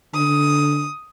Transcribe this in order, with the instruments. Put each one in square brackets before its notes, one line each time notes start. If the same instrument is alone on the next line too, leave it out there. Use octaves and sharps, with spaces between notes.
[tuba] D3 [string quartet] D#6